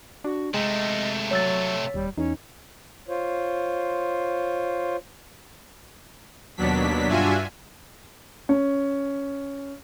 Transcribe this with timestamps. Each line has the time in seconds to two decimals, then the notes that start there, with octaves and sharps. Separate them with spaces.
0.24 D4 F#4
0.54 C3 G#3 A3 D#5
1.31 F#3 C#5 E6 A6
1.94 D#1 G3
2.18 E2 C#4 D#4
3.08 F4 C5 C#5
6.57 D#2 B2 F#3 D4 B6
7.08 G2 D4 F4 F#4 E5 G#5
8.49 C#4